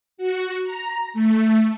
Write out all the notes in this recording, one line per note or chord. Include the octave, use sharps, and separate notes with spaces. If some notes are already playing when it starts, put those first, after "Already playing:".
F#4
A#5
A3